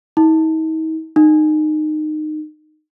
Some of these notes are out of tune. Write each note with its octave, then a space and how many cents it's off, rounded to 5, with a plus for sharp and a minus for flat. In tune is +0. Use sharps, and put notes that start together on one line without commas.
D#4 +40
D#4 -20